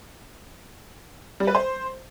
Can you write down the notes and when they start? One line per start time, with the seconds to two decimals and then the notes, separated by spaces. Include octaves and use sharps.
1.40 G3
1.47 B4
1.55 C5